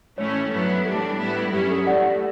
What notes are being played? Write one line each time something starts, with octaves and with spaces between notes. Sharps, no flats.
A2 E3 A3 C#4 E4 C#5
G2 F#3 B3 E4
A2 E3 G3 D4 A4
A2 G3 B3 E4
G2 F#3 C#4 E4 G4
A4
A2 E3 A3 D5 F#5